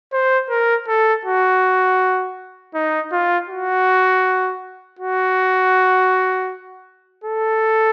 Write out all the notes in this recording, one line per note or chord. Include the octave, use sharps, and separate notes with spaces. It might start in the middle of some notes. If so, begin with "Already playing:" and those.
C5
A#4
A4
F#4
D#4
F4
F#4
F#4
A4